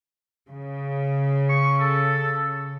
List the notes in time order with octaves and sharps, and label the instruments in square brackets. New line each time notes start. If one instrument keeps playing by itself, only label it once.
[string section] C#3
[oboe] C#6
A4